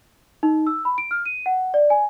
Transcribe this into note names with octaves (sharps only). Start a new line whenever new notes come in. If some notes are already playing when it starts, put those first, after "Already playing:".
D#4
E6
B5
D7
F6
D#7
F#5
D5
G#5